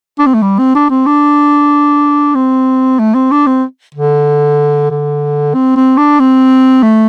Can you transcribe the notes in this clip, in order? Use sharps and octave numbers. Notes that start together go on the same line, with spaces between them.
D4
C4
A3
G3
C4
D4
C4
D4
C4
A3
C4
D4
C4
D3
D3
C4
C4
D4
C4
A3